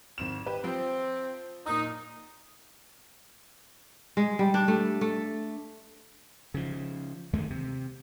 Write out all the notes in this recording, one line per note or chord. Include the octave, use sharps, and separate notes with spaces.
G#1 C4 E7
G4 B4
F3 C4
A#2 D#4 D#6
G#3
G3
D4
A3
A3
C#3 F3
D#2 D#3 G#3 A3
C3